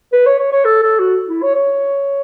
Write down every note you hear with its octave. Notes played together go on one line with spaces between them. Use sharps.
B4
C#5
C#5
C#5
A4
A4
F#4
E4
C#5
C#5